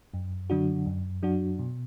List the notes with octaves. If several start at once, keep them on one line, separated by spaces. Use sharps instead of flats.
F#2
D3 F#3 D4 F#4
F#2
F#3 D4 F#4
B2